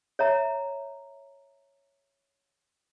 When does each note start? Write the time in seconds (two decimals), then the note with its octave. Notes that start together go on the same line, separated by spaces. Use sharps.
0.19 C#5 E5 A#5